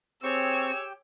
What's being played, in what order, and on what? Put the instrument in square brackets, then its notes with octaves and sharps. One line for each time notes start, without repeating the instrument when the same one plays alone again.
[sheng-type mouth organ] C4 C#6 [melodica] G4 G5 [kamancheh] G#4 C#5 [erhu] E6